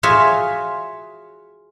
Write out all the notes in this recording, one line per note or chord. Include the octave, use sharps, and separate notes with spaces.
F4 F#4 G#4 C#5 E5 G#5